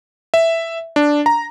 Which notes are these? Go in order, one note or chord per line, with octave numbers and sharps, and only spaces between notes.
E5
D4
A#5